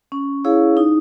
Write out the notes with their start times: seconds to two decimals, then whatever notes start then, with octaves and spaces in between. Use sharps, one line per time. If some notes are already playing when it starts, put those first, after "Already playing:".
0.12 C#4
0.45 E4 G#4 C#5 F5
0.77 D#4